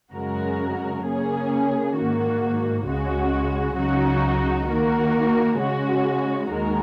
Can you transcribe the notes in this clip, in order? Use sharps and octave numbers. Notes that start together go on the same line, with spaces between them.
F#2 C#3 G#3 F#4 A#4
C#3 A#3 C#4 G#4
G#2 D#3 A#3 F#4
C#2 C#3 G#3 F#4
C#2 C#3 F#3 D#4 F#4
D#3 A#3 F#4 A#4
C#3 G#3 C#4 F#4
D#2 D#3 G#3 F#4 A#4